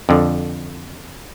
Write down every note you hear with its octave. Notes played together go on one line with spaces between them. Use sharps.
F2 D3